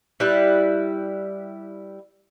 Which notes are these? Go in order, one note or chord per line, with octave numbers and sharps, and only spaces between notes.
G3 E4 B4